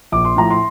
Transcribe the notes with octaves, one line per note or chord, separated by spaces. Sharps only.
A#1 D6
C6
A2 F3 A#5
C6